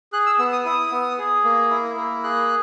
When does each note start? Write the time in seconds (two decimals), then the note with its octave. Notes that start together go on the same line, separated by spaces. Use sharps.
0.13 G#4 F#6
0.26 E6
0.39 B3 E6
0.53 D#6
0.65 E4 D#6
0.92 B3
1.18 G#4
1.44 A#3
1.71 E4
1.96 A#3
2.23 G#4 F#6